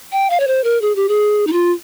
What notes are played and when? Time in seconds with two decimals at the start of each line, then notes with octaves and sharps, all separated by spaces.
0.12 G5
0.30 F5
0.40 C#5
0.47 C5
0.64 A#4
0.82 G#4
0.96 G4
1.09 G#4
1.47 D#4
1.53 F4